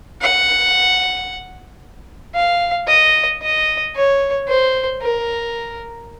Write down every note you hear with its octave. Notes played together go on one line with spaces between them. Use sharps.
F#5
F5
D#5
D#5
C#5
C5
A#4